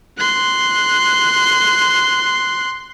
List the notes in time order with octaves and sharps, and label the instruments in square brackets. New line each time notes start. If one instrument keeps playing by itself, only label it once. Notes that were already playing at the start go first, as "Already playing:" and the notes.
[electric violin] C6 F#6